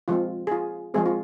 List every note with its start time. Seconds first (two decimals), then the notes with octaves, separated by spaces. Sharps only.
0.08 F3 G#3 C4 F4
0.47 G#4
0.51 F4
0.94 F3 G#3 C4 G#4
1.06 F4